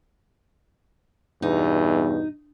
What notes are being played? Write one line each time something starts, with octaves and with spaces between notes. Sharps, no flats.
E2 G2 B2 D#4